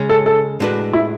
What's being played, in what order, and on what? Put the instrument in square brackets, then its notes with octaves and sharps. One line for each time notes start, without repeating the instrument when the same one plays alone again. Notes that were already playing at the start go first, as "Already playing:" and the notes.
Already playing: [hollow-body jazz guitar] C#3 G#3 C#4
[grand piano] A4
A4
[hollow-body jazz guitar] A2 G#3 D4 F#4 B4
[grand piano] E4